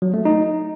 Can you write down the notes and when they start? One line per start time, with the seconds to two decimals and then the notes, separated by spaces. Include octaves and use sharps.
0.02 F#3
0.14 A3
0.25 D#4